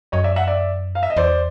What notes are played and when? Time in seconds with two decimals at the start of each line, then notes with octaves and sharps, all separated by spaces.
0.12 F#2 C#5 D#5
0.24 D5 E5
0.36 E5 F#5
0.47 D5 E5
0.95 F5
1.03 E5
1.10 D#5
1.17 E2 C5 D5